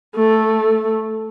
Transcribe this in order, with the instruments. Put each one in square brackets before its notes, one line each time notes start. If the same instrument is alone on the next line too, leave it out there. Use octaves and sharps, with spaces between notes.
[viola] A3